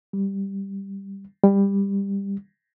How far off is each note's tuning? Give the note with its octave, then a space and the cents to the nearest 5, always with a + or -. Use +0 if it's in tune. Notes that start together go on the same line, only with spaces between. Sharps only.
G3 +0
G3 +15